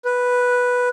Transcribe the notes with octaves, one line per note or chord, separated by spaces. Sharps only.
B4